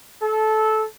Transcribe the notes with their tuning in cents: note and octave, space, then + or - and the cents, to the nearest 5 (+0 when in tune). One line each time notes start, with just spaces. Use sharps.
A4 -15